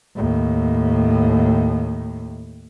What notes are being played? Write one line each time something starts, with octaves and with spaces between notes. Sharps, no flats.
D#2 A2